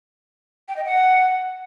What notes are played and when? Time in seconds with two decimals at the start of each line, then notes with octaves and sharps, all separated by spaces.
0.68 G5
0.77 D#5
0.85 F#5